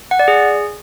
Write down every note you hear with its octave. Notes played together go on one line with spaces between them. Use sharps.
F#5
D5
G#4